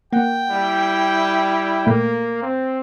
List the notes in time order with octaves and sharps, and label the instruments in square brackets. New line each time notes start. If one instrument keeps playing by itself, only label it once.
[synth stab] A#3 F#5 [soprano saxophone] G5
[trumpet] G3 [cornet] E4
[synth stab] A#2 A3 [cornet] A#3
[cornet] C4